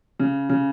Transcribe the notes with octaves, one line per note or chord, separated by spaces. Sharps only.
C#3
C#3